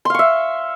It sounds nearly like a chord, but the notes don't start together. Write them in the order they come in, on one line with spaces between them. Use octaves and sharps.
C6 F5 C#6 E5